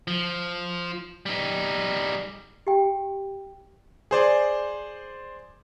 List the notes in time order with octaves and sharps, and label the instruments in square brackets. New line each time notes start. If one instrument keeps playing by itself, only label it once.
[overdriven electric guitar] F3
G3 D#4
[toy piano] G4 G5
[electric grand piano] G#4 C5 D5